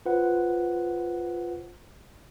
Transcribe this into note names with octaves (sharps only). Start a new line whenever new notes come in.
F4 B4 C5 F#5